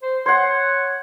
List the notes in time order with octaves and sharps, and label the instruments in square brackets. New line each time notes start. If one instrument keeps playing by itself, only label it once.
[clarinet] C5
[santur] C5 F#5 [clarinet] C#5